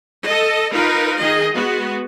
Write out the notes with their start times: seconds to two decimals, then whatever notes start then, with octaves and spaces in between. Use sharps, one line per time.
0.25 A4 D#5
0.73 D#4 F4 A#4 B4
1.18 D#3 G#4 D#5
1.54 G#3 B3 F#4